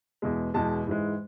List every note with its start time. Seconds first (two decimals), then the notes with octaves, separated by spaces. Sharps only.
0.22 E2 B2 G#3
0.54 E2 B2 G#3 A5
0.87 G#2 E3 G#3